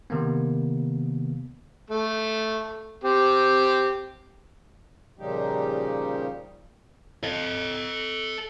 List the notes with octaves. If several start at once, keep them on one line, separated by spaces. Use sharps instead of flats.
C3 D#3 A#3 B3
A3
C4 G4
A#2 C#3 F3 G3 D#4 G4
A4 D#5